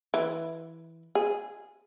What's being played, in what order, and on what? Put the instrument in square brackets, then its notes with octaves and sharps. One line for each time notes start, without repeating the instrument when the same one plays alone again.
[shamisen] E3
G#4